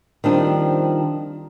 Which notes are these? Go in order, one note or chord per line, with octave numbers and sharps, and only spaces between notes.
D#3 F3 G3 C4 D4